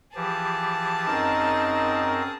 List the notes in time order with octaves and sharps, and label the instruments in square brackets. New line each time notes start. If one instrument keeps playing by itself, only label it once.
[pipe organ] E3 F3 G4 [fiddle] G#4 A5
[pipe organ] F#2 C4 A#4 [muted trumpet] D#4